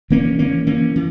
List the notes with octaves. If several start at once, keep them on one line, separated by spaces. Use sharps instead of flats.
E3 A#3 C#4
E3 A#3 C#4
E3 A#3 C#4
E3